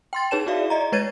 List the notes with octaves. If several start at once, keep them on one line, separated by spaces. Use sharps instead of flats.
G5 C6 A6
D#4 G#4 B4 C#5 A5 E7
E4 F#4 G#4 D5 E5 F5
D5 D#5 A#5
G#3 B4 C#5 G#6 A6 D#7